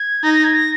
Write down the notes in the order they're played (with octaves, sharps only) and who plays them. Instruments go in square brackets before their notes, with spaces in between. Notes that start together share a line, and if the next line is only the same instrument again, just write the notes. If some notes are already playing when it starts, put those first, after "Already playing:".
Already playing: [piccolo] G#6
[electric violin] D#4 [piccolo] A#6
[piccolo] A#6
G#6
A#6